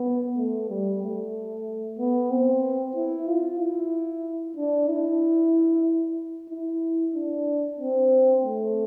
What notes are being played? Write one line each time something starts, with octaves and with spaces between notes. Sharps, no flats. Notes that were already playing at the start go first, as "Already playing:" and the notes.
Already playing: B3
A3
G3
A3
B3
C4
E4
F4
E4
D4
E4
E4
D4
C4
A3